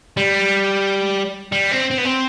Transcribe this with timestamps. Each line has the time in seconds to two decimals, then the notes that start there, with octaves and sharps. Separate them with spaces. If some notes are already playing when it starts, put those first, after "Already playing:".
0.17 G3
1.52 G3
1.72 C4
1.91 C4
1.98 B3
2.05 C4